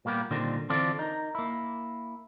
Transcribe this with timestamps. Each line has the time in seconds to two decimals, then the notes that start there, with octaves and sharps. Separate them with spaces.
0.05 A#2 G3 A#3 B3 G4
0.31 A#2 D3 D#3 G3 C4
0.69 D3 E3 C4 F4 A4 D5
0.99 D#4 A#4
1.35 A#3 E4